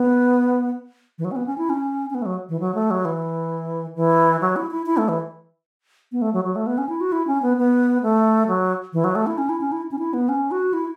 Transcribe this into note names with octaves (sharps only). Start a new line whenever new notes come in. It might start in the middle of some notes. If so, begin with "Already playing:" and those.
Already playing: B3
E3
F#3
C#4
B3
C#4
E4
C#4
C#4
B3
A3
F#3
E3
F#3
A3
F#3
E3
E3
F#3
E4
E4
E4
A3
E3
B3
A3
F#3
F#3
A3
B3
C#4
E4
F#4
E4
C#4
B3
B3
A3
F#3
E3
F#3
A3
E4
C#4
E4
C#4
E4
C#4
E4
B3
C#4
F#4
E4